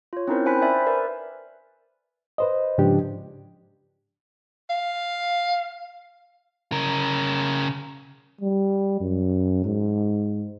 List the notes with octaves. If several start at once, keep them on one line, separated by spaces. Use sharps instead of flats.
F4 C#5
C4 C#4 D#4 E4 A#4 C5
C5 G5 G#5 B5 F#6 B6
C5 D5 E5 G#5 B5
A#4 B4 D5 E5
B4 C5 D#5
G#2 C#3 F3 D4 G4
F5
C#3 A#4
G3
F#2
G#2